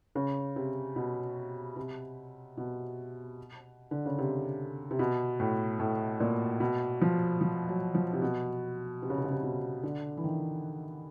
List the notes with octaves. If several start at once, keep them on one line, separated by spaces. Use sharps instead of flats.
C#3
C3
B2
C3
B2
D3
C#3
C3
C3
B2
A2
A2
A#2
B2
F3
F3
F#3
F3
C3
B2
C3
C#3
C3
C#3
C3
B2
D3
E3
D#3